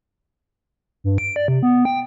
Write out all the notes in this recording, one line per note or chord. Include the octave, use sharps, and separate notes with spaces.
G2
D7
D5
C3
B3
G5